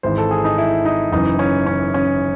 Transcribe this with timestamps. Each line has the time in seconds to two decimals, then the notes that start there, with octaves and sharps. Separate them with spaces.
0.03 G#1 G#2 E3 C5
0.18 A4
0.31 G#4
0.44 D#4
0.58 E4
0.85 D#4
1.12 F#1 F#2 E3 D#4
1.39 C#4
1.66 C#4
1.94 C#4